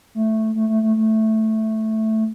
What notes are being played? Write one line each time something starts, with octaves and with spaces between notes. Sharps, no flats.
A3
A3
A3
A3
A3